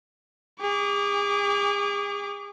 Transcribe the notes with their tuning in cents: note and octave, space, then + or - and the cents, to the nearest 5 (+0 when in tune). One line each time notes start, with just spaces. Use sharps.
G#4 -40 D6 -25